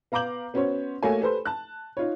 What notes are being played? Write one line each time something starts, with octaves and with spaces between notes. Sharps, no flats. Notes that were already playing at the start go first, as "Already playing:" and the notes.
B3 F5 A#5 D6 G6 F#7
B3 C#4 F#4 C5 C#5
A3 A#3 F#4 C#5 G#5
G4 A4 B4 C5
A5 F#6
D#4 F4 C#5